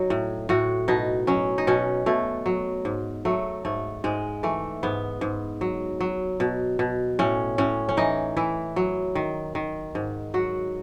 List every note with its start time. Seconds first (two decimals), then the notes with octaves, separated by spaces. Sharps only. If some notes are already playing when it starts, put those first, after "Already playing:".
Already playing: F#3 D#4
0.10 A2
0.49 A2 F#4
0.88 B2 D#4
1.27 F#3 C#4
1.58 D#4
1.67 B2 C#4
2.06 B2 A3
2.46 F#3
2.85 G#2
3.25 F#3 A3
3.65 G#2 A3
4.04 G#2 G#3
4.43 E3 A3
4.83 G#2 B3
5.21 G#2
5.61 F#3
6.00 F#3
6.40 B2
6.79 B2
7.19 A2 C#4
7.58 A2 C#4
7.89 C#4
7.97 E3 D#4
8.37 E3 E4
8.76 F#3
9.15 D#3
9.55 D#3
9.95 G#2
10.34 F#3 F#4